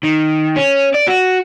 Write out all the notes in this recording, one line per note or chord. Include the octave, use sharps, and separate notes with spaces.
D#3
C#4
D5
F#4